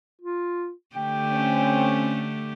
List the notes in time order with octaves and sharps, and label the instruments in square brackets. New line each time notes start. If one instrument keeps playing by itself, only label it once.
[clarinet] F4
[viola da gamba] D3 A3 G4 [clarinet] G5
[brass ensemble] C4 C#4